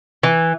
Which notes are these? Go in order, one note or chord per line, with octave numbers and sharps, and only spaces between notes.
E3